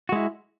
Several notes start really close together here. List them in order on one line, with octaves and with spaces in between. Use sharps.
F#4 G#3 E4